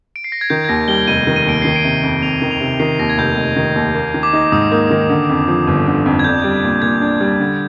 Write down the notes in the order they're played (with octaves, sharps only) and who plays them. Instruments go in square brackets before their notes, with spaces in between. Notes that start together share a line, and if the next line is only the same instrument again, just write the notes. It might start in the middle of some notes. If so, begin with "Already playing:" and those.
[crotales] D7
C7
A#6
G#6
[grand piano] D#3 [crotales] G6
[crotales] G#6
[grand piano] D#2 [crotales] A#6
[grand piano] G3 [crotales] G7
[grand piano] F1 [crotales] D#7
[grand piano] D#3
[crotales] D#7
[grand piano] D#2 [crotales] D7
[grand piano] D#3 [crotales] C7
[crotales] D7
[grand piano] C3
F2
[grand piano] F2 [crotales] F7
[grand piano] D#3
[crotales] F7
[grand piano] C3
[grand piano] D#3 [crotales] C7
[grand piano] D#2 [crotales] A#6
[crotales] G#6
[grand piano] F1 [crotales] G6
[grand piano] F1
D#3
D#2
A#3
D#3
[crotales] D6
[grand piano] D#4
[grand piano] G#2 [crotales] D#6
[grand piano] A#3
D#3
D3
F2
F3
G1
D3
F2
[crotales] G#6
[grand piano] D4 [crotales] G6
[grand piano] G3
A#2
[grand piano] A#2 [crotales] G#6
[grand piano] D4
G3
D3